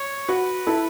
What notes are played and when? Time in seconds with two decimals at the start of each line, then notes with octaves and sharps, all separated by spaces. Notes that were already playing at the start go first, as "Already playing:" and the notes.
Already playing: C#5
0.28 F#4 B4
0.67 E4 A4